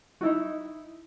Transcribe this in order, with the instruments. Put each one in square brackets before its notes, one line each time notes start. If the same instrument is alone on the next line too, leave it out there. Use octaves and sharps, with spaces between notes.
[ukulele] D#4 E4 F#4